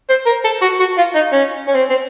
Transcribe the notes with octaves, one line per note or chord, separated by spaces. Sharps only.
C5
A#4
A4
F#4
F#4
F4
D#4
C#4
C#4
C4
C4